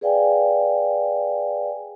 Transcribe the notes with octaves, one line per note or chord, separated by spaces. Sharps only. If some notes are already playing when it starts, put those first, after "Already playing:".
G#4 B4 D5 F5 G5 G#5